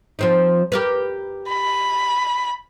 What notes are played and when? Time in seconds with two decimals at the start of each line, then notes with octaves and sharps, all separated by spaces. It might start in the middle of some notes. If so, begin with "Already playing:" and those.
0.19 F3 C4 D#4
0.72 G4 A#4 B4
1.49 B5